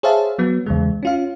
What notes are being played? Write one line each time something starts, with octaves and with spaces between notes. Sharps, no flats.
G#4 C5 C#5 E5 F5 A5
F#3 B3
E2 C#3 G#3
C#4 F4 F5